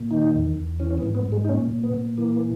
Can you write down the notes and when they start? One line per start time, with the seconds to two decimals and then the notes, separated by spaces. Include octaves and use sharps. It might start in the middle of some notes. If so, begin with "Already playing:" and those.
Already playing: A#2
0.11 D#3 D#4
0.35 E2
0.57 E2
0.80 E3 C#4
0.90 C#4
0.98 B3
1.03 G#2
1.15 B3
1.26 G#2
1.32 G#3
1.45 D#4
1.49 A#2 C#4
1.71 A#2
1.83 B3
1.94 A#2
2.18 E3 A#3